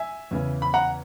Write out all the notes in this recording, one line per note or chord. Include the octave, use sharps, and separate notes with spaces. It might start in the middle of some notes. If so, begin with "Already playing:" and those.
Already playing: E5 G#5
E2 C#3 E3
B5
F#5 A#5